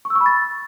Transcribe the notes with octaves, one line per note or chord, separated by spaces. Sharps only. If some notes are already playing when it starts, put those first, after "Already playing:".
C#6
E6
C#6
B5
A6